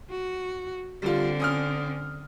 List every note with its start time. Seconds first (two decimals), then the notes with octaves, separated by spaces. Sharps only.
0.10 F#4
1.02 D3 G3 C4 F4
1.40 C#4 D#6 F6